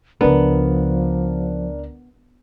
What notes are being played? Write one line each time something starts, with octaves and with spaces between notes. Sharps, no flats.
C#2 C#3 F3 B3 D4 A#4